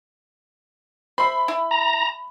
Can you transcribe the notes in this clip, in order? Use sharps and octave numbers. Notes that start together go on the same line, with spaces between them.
C5 E5 B5
E4
A#5